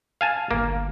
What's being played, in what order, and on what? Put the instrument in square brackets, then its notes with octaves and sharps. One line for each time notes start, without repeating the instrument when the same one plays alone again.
[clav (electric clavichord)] F5 G#5 A5
[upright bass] G1 [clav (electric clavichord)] A#3